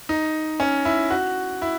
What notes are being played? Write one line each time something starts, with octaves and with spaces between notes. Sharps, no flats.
D#4
C#4
E4
F#4
E4